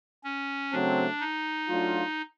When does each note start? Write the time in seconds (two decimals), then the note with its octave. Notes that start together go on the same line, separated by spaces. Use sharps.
0.24 C#4
0.72 C#3 F#3 A3 C4 D4
1.20 D#4
1.69 F#3 A3 D4 F4